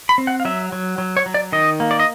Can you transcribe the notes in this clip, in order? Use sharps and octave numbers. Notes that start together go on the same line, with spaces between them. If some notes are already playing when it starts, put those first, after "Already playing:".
B5
C4
F#5
F5
F#3 E5
F#3
F#3
C#5
F#3
D5
D#3 D#5
A#3
D5
D#5